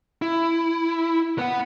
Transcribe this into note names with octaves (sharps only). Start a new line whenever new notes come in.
E4
B3 F#5